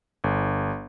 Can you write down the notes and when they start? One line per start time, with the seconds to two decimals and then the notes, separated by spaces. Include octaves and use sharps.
0.24 G1